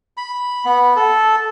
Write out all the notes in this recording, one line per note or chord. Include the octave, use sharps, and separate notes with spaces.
B5
B3
A4